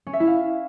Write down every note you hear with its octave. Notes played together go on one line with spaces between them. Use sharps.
C#4
E5
E4
F5